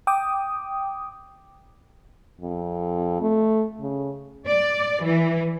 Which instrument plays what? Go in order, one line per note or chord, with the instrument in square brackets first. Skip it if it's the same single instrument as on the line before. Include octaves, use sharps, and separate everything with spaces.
[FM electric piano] G5 D6 D#6
[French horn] F2
A3
C#3
[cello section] D5
E3